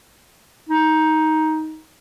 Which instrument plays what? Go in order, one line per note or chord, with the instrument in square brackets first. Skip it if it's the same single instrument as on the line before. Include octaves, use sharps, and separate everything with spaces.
[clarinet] D#4